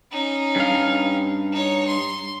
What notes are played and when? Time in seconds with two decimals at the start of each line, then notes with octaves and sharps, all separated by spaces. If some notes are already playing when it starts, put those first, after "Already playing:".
0.12 C#4 D#4
0.56 G2 F5
1.52 D#4 C#5
1.88 C6